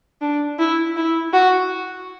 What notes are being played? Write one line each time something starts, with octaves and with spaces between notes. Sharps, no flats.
D4
E4
E4
F#4